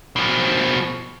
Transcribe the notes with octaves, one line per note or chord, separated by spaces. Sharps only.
B2 F3